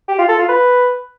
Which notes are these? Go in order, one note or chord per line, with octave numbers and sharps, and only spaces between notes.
G4
F4
A4
F4
B4